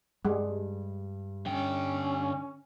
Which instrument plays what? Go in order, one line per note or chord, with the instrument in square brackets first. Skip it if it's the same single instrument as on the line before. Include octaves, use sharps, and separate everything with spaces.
[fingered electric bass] G2 [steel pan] G3 G#3
[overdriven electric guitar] D3 G5 [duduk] C#4